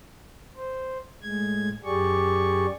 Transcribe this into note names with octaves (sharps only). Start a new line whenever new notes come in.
C5
A2 G#3 G#6
F#2 G4 G#4 D5 C#6